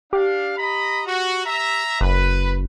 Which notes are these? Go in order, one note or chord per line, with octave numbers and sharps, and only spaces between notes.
D4 G4 F5
D#5 A#5 B5
F#4
E5 A#5
F#1 B4